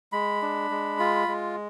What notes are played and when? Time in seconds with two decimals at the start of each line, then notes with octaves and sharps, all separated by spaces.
0.12 G#3 B5
0.42 D4
0.71 G#3
0.99 F4
1.28 G#3